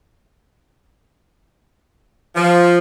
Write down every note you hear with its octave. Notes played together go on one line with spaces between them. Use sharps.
F3